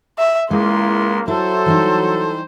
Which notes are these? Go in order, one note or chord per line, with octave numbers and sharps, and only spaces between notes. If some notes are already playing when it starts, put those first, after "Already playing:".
E5
C#2 G#3 A#3 E4 C6
F#3 E4 A4 C5
E3 G3 D#4